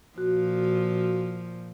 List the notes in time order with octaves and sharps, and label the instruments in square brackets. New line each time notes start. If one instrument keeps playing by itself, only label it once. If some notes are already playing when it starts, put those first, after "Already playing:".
[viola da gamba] A#2 F3 [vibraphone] F#4